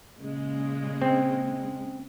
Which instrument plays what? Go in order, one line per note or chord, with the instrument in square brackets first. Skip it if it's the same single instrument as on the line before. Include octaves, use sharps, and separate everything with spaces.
[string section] A#2 C#3 G#3
[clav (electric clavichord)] C4